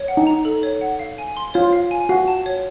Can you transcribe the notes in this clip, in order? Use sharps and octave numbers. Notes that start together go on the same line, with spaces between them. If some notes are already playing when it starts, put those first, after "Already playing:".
Already playing: C#5
F#5
D#4
A#5
A4
C#5
F#5
F5
G#5
C6
F4 C#5
F5
G#5
F#4 F5
A5
C#5